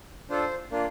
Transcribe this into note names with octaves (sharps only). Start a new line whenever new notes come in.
D4 F4 A4 C5
A#3 D4 F4